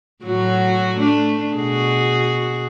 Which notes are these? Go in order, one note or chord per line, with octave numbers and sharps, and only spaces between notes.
A2 F#3 F#4
A3 D4
B2 F#4 G#4